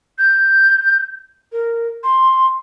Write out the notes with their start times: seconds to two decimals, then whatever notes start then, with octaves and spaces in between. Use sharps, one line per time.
0.18 G6
1.52 A#4
2.03 C6